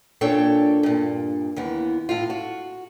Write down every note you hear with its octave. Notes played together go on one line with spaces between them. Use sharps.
A#2 D4 A4 C#5 G5
G2 A#2
D#2 E3 B3
A2 F4
F#4